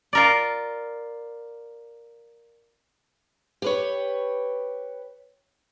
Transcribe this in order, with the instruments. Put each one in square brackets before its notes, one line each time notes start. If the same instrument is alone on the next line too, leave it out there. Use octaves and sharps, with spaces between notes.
[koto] F4 A#4 D5
[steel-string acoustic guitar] G4 B4 C#5